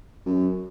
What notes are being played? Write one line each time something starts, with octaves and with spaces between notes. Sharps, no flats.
F#2